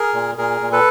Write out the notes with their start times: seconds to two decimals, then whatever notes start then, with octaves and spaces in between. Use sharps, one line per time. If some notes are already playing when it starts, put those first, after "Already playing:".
Already playing: G#4 A#4
0.14 A#2
0.38 A#2 G#4 A#4
0.61 A#2
0.72 A4 B4